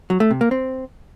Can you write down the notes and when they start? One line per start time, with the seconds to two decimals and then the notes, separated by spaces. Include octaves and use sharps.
0.10 F#3
0.20 A3
0.31 C3
0.41 A#3
0.51 C4